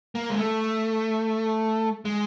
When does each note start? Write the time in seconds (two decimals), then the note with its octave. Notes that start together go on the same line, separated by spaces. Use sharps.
0.15 A#3
0.30 G#3
0.39 A3
2.05 G#3